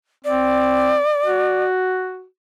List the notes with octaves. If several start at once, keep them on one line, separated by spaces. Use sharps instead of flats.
C4 D5
F#4